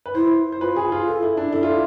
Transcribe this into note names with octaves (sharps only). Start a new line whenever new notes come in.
B4
E4 C5
C5
F4 B4
G#4
F4
A4
E4
D4
E4 A4
F4